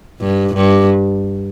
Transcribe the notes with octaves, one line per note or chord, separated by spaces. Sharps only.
G2
G2